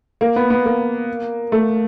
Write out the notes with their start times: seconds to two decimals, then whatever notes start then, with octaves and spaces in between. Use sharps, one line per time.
0.21 A#3
0.36 B3
0.50 B3
0.65 A#3
1.52 A3